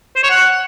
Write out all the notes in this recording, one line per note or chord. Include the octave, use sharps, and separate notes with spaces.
C5
C#5
F#5